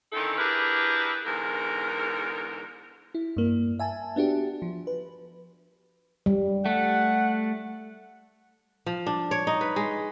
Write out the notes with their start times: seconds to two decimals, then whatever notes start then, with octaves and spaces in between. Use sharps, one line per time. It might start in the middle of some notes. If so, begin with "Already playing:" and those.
0.13 D3 D#3 C4 C#4 E4 A4
0.38 D4 E4 G4 G#4 A#4 B4
1.26 E2 G#2 D3 A#4
3.15 E4
3.37 G2 A#3
3.79 E5 G#5 A5
4.16 B3 D4 F#4 G4
4.62 F3
4.87 B4
6.26 G3
6.66 A3 F#5
8.86 F3
9.07 D4
9.31 C#5
9.47 D#4
9.61 B4
9.76 G#3